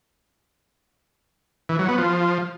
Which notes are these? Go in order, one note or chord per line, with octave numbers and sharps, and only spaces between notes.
E3
F#3
B3
F3